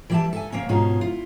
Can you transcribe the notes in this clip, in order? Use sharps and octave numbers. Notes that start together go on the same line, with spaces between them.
E3 G3 G4 D5 E5 A5
A4 E5 G#5
C3 A#3 C4 C#4
G#2 B2 C#4 F4 G#4 A#5
E4 F4